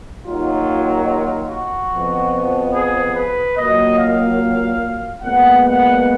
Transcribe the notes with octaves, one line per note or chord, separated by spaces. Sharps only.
D#2 D#3 F#3 F4
F4
F#4
F2 F3 B3
G#4
B4
A#2 F#3 A#3 D#5
F5
A#2 G#3 B3 F#5
F#5